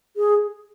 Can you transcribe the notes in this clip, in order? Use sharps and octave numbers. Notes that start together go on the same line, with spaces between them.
G#4